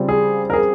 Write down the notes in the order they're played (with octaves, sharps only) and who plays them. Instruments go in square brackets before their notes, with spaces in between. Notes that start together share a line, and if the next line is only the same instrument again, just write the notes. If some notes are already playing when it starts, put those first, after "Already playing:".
Already playing: [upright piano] C#3 G3 C4 F4
[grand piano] G#4
A#4
G#4